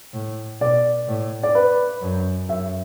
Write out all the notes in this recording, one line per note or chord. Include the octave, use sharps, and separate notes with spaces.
A2
B2 D5
A2
D5
B4
F#2
F#2 E5